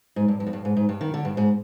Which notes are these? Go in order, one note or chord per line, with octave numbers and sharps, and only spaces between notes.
G#2
G2
G2
F2
G2
G#2
G#2
G2
D#3
D3
G2
G#2